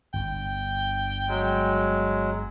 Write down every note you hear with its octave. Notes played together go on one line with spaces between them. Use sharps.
G1 D3 G5
F#3 G#3